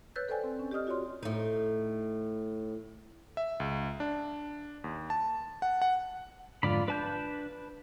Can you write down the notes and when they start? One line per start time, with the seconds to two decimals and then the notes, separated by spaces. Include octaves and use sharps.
0.16 B4 C#5 E6 F#6 G6 A6
0.28 A4 B4 C5 D5 G5 G#5
0.44 C4
0.59 C#4
0.71 G4 D5 D#5 D#6 F6
0.87 F4 F#4 C#5 D5 C6
1.23 A2 D#4
3.37 E5
3.60 C#2
4.00 D4
4.84 D#2
5.10 A5
5.62 F#5
5.82 F#5
6.63 F2 G#2 D3 F4 D5 B5
6.88 D4 B4 A5 G6